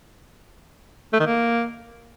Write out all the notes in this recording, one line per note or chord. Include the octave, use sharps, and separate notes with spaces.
A3
D#3
A#3